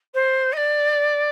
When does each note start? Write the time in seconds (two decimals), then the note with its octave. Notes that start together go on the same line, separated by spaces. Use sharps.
0.14 C5
0.52 D#5
0.57 D5